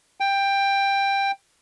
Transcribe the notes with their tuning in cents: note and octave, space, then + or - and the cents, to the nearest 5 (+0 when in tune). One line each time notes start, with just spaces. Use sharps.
G5 +15